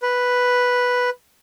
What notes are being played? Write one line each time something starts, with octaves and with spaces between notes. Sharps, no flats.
B4